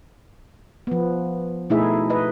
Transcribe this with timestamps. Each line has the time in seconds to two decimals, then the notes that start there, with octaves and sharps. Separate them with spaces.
0.87 F3 B3
1.70 B2 A3 D#4 E4 G#4 E5
2.10 B4 D#5